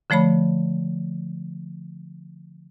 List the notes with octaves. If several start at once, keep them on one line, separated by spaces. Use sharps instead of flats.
D3 F3 A3 C#5 B5